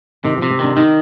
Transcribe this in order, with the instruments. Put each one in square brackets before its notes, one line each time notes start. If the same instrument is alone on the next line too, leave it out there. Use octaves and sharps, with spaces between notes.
[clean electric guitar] C3 [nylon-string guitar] D#3
[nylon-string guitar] F3
[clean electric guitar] C3
[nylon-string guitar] C4
[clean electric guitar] D#3 [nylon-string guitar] D4
[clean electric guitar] D#3 [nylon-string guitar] D#4